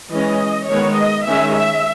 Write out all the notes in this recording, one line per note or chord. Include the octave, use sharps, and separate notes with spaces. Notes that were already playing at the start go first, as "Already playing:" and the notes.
E3 G#3 C#4 D#5
D#3 G#3 B3 C#5
D#5
D#3 G#3 C#4 E5
E5